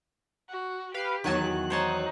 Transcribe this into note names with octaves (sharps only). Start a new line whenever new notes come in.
F#4
G4 B4 F5
E2 D#3 F#3 G#5 A5 F#6
D#4 C5 C#5 A5